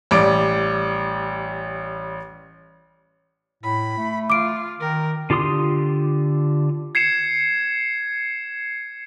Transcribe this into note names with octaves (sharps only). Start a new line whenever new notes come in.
A1 G3 D5 D6 D7
A2 B5
A3
F4 D6 D7
D#3 A#4
D3 F4 G4 C6 D#6
G#6 C7 C#7 E7